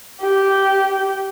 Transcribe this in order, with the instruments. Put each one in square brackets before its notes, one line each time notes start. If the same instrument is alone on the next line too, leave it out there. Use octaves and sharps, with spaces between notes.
[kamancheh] G4